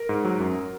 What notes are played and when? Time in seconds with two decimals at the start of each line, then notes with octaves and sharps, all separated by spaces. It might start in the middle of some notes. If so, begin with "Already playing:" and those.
Already playing: A#4
0.09 G#2
0.25 F#3
0.40 F#2